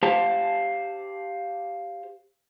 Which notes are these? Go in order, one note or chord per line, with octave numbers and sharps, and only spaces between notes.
G4 C5 F5 A5